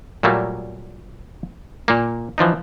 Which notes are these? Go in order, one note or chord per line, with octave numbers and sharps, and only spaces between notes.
A#2 F#3 G3 A3 A#3
A#2 A#3
E3 F3 D4 D#4